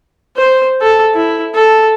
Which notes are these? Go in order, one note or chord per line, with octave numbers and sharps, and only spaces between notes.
C5
A4
E4
A4